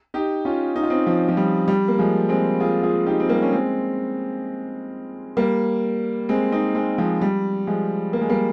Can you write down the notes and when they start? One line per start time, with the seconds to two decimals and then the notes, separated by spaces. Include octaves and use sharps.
0.14 D#4 G4
0.45 C#4 F4
0.76 D#4
0.83 F4
0.90 C4 D#4
1.07 F3
1.28 F3
1.37 G3
1.68 G3
1.88 A#3
1.99 F3 G#3
2.29 G#3 C4
2.60 F4 G#4
2.83 F4 G#4
3.06 D#4 G4
3.20 C4
3.29 G3 A#3
3.42 C#4
3.52 G#3 C4
5.37 G3 A#3
6.29 G#3 C4
6.52 C4 D#4
6.75 G#3 C4
6.98 F3 G#3
7.21 G3
7.67 F3 G#3
8.13 A#3
8.21 G#3
8.29 G3 A#3